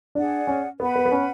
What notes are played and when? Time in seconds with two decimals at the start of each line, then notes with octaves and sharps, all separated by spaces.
0.15 D4 G#4 D5 F#5
0.47 C#4
0.79 B3 B4 F#5 B5
0.96 B3
1.06 B3
1.12 C#4